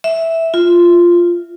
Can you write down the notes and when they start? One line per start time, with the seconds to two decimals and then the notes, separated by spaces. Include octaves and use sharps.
0.04 E5
0.54 F4